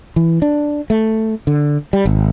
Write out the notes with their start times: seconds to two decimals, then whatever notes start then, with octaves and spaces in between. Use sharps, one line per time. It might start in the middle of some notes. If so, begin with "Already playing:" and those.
0.16 E3
0.42 D4
0.90 A3
1.47 D3
1.93 G3
2.05 G#1